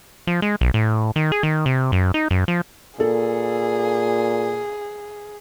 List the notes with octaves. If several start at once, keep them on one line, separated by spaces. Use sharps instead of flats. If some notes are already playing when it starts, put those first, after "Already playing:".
F3
G#3
B1
A2
D#3
G#4
D#3
C3
F#2
D#4
F#2
F3
A#2 G#4 A4